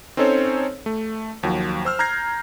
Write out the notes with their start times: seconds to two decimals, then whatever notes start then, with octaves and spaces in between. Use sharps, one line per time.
0.17 C4 C#4 D#4 A4 C5 C#5
0.86 A3
1.43 D#2 F3 F#3
1.85 C5 E6 F6
1.99 A#5 F6 G6 G#6 A#6 C7